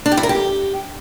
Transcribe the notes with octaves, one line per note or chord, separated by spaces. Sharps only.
D4
G4
E4
A#4
G4